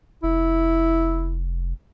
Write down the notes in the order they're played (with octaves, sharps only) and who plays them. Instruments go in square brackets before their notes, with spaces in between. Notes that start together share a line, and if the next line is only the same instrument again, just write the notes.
[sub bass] F1 [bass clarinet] E4